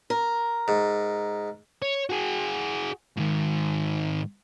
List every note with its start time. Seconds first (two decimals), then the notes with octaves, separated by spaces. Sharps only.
0.10 A#4
0.68 G#2
1.82 C#5
2.10 F#4 G#4
3.17 G#2 D#3